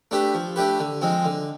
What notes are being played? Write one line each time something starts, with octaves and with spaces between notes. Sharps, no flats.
A3 D4 G4 B4
F3
A3 D4 G4 B4
D3
F3 G#3 C4
D3